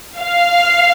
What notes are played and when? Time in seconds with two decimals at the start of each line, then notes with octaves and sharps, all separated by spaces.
0.20 F5